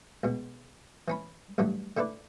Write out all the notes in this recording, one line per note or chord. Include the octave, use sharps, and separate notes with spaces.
C#2 B2
E3 C#4 B5
A1 G2 F#3 A3
D3 A3 E4 B4 D5